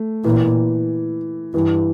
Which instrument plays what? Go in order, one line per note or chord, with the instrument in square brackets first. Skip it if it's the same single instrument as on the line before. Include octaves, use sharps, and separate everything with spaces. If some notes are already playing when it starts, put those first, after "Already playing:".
Already playing: [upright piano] A3
[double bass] A#2 [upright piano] E3
[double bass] G2 [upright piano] E3